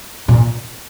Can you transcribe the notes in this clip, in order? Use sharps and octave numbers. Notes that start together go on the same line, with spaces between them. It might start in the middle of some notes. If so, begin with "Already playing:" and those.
A#2